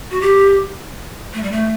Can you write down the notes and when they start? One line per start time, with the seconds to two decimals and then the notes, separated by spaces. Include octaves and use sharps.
0.11 F#4
0.21 G4
1.33 A3
1.43 G3
1.51 A3